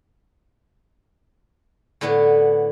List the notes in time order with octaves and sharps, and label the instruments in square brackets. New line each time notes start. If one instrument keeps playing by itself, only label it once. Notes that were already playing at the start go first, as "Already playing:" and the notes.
[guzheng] A2 D3 B3 D4